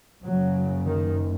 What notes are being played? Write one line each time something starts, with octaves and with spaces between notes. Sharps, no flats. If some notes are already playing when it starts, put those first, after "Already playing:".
F#1 F#2 C#3 F#3
D#3